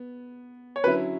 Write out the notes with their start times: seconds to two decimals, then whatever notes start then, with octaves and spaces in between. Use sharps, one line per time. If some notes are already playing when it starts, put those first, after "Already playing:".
Already playing: B3
0.76 C#5
0.84 D3 F#3 C#4 E4 B4